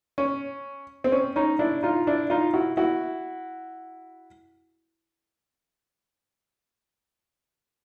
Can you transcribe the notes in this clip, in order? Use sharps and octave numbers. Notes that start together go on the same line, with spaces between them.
C#4
C4
C#4
C#4 D#4
D4 E4
D#4 F4
D4 E4
D#4 F4
E4 F#4
E4 F#4